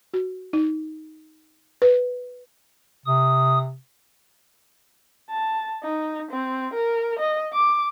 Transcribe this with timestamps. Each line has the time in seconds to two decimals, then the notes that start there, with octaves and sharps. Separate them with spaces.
0.14 F#4
0.53 D#4
1.82 B4
3.06 C3 D#6
5.30 A5
5.83 D#4
6.31 C4
6.73 A#4
7.19 D#5
7.53 D6